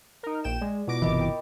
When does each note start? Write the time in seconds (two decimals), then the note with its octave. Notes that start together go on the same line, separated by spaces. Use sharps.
0.23 D#4 A#4
0.44 A#1 G5 E7
0.61 G#3 D5
0.87 B2 E4 F4 D6 A#6
1.02 G1 C3 E3 A#4 D#5 B5
1.21 G5